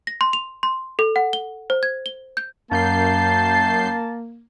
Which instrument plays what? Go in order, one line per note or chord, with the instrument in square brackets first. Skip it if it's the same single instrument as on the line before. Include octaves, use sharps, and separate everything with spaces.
[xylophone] A#6
C6
F7
C6
A4
F#5
G7
C5
G#6
G7
G6
[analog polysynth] F#2 G6 C7 [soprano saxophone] A#3 [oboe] A5